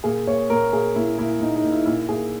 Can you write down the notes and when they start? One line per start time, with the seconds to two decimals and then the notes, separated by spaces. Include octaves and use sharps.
0.04 A#2 G#4
0.27 A#2 C#5
0.50 A#2 A#4
0.72 A#2 G#4
0.96 A#2 E4
1.18 A#2 E4
1.40 A#2 D#4
1.56 D#4
1.63 A#2
1.72 E4
1.86 A#2 E4
2.09 A#2 G#4